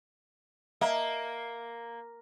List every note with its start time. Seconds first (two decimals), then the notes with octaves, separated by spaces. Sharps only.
0.81 A#3 D#5 E5 A5